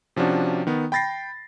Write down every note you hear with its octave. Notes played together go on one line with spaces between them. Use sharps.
C3 F3 C#4 D4 F#4
D#3 B3
G5 B5 A6 A#6 C7